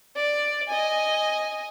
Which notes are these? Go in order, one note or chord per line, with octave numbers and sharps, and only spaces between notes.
D5
D#5 G#5